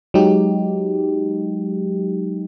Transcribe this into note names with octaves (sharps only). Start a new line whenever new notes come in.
F#3 G#3 D#4 G4